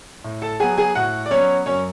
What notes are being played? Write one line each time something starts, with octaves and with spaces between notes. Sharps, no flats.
A2
A4 A5
F#3 B3 G#4 G#5
G#4 G#5
A2 F#4 F#5
D5
F#3 B3 C#4 C#5
F#2 C#4 C#5